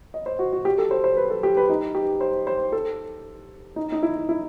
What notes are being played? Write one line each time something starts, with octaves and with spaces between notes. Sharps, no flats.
D#5
C5
F#4
F#4
G4
A4
C5
C5
B4
A4
G4
B4
D#4
G4
C5
C5
A4
D#4
D#4
E4
E4